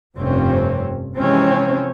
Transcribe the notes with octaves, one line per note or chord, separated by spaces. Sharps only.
F1 G2 C3 C4 C#4
C3 E3 F3 G#3 C4 C#4